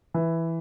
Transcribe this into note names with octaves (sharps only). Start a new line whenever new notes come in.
E3